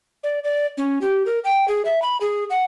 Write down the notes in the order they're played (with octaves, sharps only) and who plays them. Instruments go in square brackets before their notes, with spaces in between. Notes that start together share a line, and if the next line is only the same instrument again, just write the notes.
[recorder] D5
D5
C#4
G4
A#4
G5
G#4
E5
B5
G#4
F#5